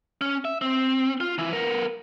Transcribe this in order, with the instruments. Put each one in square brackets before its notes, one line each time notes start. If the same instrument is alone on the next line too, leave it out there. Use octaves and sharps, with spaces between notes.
[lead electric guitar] C#4
E5
C4
F4
E3 E4
B3 A#4